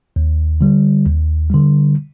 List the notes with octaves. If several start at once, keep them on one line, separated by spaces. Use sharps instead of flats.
D#2
D3 G3
D#2
D3 G3